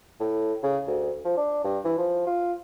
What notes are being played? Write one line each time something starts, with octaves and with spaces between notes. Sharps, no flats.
A2
C#3
D2
F3
D4
G2
E3
F3
F4